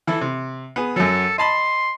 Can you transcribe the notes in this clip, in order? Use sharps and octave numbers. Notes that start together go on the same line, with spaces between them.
E3 E4 A4
C3
B3 G#4
F#2 F#3 A4
D#5 A5 B5 C6